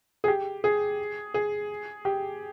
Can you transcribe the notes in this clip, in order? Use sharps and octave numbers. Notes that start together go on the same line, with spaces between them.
G#4
G4
G#4
G#4
G4